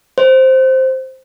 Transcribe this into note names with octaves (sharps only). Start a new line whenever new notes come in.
C5